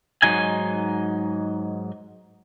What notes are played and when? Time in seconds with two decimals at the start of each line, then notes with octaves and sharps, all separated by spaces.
0.22 G#2 F#3 D#4 G#5